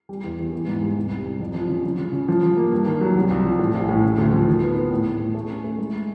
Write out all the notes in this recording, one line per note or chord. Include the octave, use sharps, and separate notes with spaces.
G3
E2
E2
E3
G#2
G3
C2
C2
C2
F2
F3
C#3
F3
C#3
C#3
F3
F3
A#3
G2
D#3
F#3
C2
C2
F3
A2
A#1
A2
C#3
D2
F3
D#3
B3
B3
A2
A2
A2
A3
C#4
A3
G#3